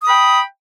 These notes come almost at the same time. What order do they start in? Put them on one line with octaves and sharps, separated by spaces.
D#6 B5 G5